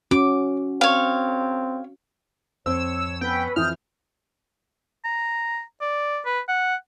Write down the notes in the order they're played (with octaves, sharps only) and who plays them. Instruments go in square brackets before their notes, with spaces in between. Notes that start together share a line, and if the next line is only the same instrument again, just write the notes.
[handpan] C#4 F#4 [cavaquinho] D6
[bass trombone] C4 [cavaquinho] C#5 F5
[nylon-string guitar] F2 C4 [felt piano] C5 [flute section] C#5 [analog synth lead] E6
[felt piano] B3 [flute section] C#4 B4 E6 [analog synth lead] G5
[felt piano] F2 E3 [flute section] D#6 G6 [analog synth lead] F6
[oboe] A#5
D5
B4
F#5